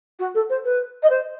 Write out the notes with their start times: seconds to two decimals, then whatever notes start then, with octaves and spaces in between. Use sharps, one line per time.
0.19 F#4
0.34 A4
0.49 C5
0.64 B4
1.02 D#5
1.10 C5